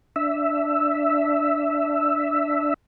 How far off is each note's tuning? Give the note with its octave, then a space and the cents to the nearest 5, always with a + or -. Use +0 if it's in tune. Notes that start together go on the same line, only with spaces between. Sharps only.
D4 -5 E5 +0